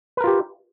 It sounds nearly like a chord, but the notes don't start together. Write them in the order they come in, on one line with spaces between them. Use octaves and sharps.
B4 A#4 F4 G4